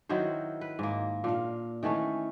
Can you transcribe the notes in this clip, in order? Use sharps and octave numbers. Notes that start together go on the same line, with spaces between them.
D#3 F#3 E4 C5
B4
G#2 A#3
A#2 D4 F5
D#3 E3 A3 C#4